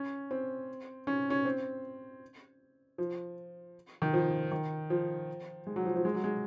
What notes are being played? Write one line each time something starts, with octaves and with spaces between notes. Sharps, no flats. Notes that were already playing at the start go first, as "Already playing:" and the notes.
Already playing: C#4
C4
C#4
C#4
C4
F3
D#3
F3
D#3
F3
G#3
F#3
F3
F3
G#3
F#3
G#3